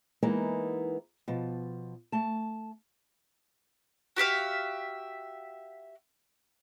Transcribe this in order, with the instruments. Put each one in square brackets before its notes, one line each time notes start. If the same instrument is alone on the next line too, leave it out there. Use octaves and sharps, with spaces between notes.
[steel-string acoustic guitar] E3 G#3 A#3 B3 D#4 E4
B2 F3
A3 A5
[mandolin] F#4 G4 E5 F5